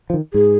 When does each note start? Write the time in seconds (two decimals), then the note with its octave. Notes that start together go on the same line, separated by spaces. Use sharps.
0.10 F3
0.14 D#3
0.34 G#2 G#4